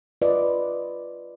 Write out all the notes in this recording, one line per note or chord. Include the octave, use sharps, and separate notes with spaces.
F4 B4 D5 D#5